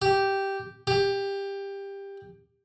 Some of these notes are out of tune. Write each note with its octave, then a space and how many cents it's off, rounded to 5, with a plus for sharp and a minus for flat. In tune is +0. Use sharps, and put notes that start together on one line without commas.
G4 -5
G4 +15